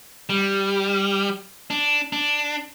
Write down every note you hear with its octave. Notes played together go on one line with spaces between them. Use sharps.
G3
D4
D4